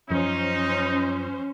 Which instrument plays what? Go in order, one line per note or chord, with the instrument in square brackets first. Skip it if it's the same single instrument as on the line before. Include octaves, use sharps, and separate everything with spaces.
[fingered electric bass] F#2 F3 [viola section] C#4 C5 [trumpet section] D#4